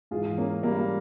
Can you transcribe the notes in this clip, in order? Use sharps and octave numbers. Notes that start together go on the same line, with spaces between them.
G#2 E3 F4 G#4
A#3 C#4
G3 A#3